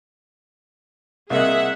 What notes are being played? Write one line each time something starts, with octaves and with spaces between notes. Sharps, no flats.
C2 A#3 G#4 D#5 E5 F#5